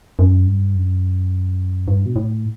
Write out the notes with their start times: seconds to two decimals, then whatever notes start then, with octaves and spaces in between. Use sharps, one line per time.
0.19 F#2
0.47 G2
0.75 F#2
1.88 G2
2.06 B2
2.16 A2